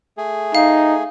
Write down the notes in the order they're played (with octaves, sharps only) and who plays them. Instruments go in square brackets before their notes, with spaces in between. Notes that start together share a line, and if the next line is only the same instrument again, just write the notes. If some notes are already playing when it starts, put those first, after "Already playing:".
[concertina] A3 G#4
[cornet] D#4 [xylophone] F5